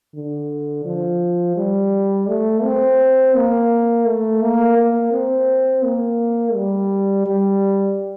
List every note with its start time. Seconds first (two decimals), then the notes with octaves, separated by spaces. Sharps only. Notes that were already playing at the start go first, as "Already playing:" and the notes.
0.15 D3
0.85 F3
1.57 G3
2.28 A3
2.64 C4
3.35 A#3
4.06 A3
4.41 A#3
4.77 A#3
5.12 C4
5.83 A#3
6.54 G3
7.26 G3